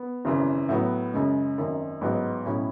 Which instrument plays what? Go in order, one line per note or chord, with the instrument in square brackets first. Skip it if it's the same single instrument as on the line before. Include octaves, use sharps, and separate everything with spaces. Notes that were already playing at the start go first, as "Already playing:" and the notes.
Already playing: [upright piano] B3
G#1 F#2 C#3 E3
A2 F#3 B3
F#2 C#3 G#3
G#1 F#2 D#3
A1 G#2 F#3 B3
B1 A2 F#3 C#4 E4